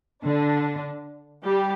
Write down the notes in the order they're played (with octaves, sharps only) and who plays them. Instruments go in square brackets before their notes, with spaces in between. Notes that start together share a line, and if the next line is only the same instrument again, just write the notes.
[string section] D3 D4
G3 G4